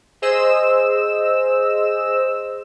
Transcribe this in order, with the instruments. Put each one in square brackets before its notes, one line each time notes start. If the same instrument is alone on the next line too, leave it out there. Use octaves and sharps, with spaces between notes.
[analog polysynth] G#4 C5 D#5 E6 E7